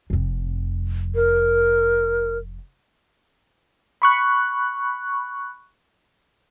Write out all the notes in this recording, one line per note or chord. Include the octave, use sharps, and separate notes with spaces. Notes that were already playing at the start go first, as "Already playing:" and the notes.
F1 F2
A#4
B5 C#6 F#6